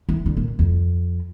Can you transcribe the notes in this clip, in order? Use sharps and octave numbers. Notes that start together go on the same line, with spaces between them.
E3
D3
A#2
F2